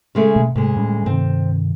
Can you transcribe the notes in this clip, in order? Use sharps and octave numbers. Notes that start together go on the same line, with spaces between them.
C#3 G#3 A3
B2
D2 G#2 C3 G#3
A2 G3 C#4
G2 C3 D#3 C4